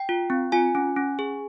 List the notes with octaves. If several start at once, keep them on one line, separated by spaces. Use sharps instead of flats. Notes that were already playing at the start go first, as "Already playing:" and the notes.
Already playing: G5
F4
C4
F4 G#5
C#4
C#4
G#4